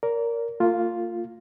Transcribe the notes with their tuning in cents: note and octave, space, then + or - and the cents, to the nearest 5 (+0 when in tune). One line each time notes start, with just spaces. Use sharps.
A#4 +0 D5 -35
A#3 -45 F4 +0